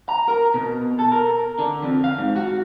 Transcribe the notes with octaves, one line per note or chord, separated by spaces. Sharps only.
A#5
A#4
B2
A4
A#4
D3
F2
F5
G#2
F#4